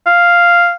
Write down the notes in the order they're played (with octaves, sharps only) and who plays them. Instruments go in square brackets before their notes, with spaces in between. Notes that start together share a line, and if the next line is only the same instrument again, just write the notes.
[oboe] F5